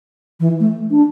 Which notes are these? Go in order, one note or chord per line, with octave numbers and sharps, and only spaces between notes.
E3
A3
D4